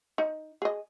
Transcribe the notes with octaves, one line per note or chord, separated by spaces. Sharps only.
D#4
G#4 D#5